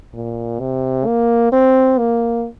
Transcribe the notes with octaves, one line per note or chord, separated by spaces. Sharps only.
A#2
C3
A#3
C4
A#3